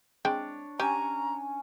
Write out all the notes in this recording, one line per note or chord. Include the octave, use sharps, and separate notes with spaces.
G#3 C4 D4 C#5 G5
C#4 G4 G#5 A#5